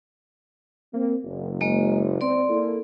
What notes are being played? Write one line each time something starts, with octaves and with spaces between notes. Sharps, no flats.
A#3 C4
F#1
G#3 A#3 D#5
C4 D5 C6
A#3 E4 A4